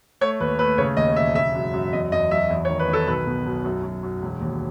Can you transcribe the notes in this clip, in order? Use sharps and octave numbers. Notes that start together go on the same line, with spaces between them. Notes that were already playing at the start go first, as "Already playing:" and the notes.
A3 C#5
D#2 B4
A3 B4
C#3 C#5
D#2 D#5
E1 E5
C#3 E5
F#2
F#2
E2 D#5
E2 D#5
F#3 E5
E2
C#5
D#3
B4
D#3
A4
B1 B4
B2
B1
F#2
F#2
F#2
E1
D#2